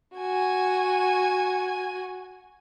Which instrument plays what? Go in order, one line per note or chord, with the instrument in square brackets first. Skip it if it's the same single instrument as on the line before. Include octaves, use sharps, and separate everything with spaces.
[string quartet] F#4 G#5